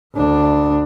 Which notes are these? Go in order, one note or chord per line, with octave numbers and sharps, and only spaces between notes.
D2 D4